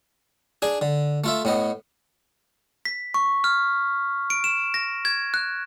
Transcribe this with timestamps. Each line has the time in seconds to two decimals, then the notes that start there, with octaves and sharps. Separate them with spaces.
0.62 D4 G#4 G#5
0.81 D3
1.24 A3 F4 E5
1.45 A2 B3 D#5
2.85 B6
3.14 C#6
3.44 F6
4.30 D7
4.44 E7
4.74 A#6
5.05 G#6
5.34 F#6